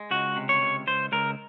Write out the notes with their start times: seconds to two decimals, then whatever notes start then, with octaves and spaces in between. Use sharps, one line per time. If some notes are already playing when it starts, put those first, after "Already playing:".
Already playing: G#3
0.11 C#2 F#4
0.36 C3
0.49 C#5
0.61 C#2
0.87 C#2 C5
1.12 C#2 A#4